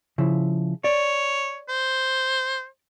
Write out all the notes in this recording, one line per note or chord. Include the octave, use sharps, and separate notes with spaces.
C#3 F3 E4
C#5 D5
C5